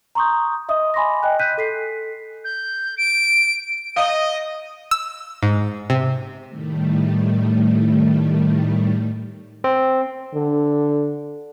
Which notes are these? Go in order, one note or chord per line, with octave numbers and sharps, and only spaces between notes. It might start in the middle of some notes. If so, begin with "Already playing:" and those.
A#5 C6 C#6 D#6 G6
D#5 E5 D#6
G#5 B5 C6 D6 A#6
D#5 G5 G#5 F#6
F#6 G6 B6 D#7
A4 B6 C7
G6
D7
D#5 F5
E6
G#2
C3
A2 D#3 G3 A3
C4
D3